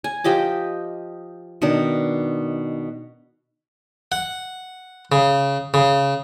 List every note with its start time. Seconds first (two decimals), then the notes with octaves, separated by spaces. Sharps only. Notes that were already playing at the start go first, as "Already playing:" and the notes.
0.04 G#5
0.24 F3 G4 D#5 D6
1.62 B2 D#3 D4
4.12 F#5
5.12 C#3
5.74 C#3